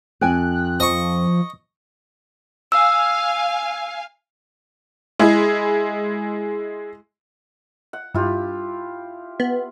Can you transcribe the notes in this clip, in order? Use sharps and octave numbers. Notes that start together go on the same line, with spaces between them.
F2 G5 G#5 F#6
F3 D#5 C#6
F5 G#5 E6
G#3 E4 G#4
F#5
G2 E4 F4 G4
B3